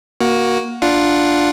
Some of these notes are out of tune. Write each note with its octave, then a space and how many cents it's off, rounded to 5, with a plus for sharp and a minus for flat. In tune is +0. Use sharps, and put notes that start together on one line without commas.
A#3 +15 F#4 +0
D4 +0 F4 +0 F#5 +0